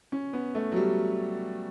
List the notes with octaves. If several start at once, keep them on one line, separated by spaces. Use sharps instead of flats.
C#4
B3
A3
F#3
G3